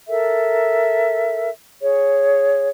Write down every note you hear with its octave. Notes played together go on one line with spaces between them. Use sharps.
A4 A#4 E5
G#4 C#5